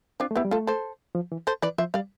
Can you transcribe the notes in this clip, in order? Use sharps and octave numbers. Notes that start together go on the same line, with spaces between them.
C4 D4 F4
A3
B3 E4 G4
G3
A3 F4 A4
A4 C5
F3
E3
A4 C5
E3 B4 D5
F3 C5 E5
G3 D5 F5